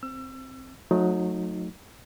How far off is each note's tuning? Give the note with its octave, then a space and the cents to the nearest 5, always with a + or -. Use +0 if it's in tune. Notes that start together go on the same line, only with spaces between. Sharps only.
C4 +0 E6 +30
F#3 -30 A3 -5 D#4 +0